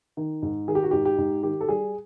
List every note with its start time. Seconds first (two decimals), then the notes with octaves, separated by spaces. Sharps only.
0.17 D#3
0.42 G#2
0.68 D#3 G#4
0.75 G4
0.83 F#4
0.91 G#2 G4
1.05 G4
1.18 G#2
1.43 D#3 G4
1.61 A4
1.69 G3 G#4